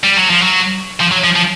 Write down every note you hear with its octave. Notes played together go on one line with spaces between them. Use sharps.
G3
F#3
F3
F#3
F3
F#3
F3
F3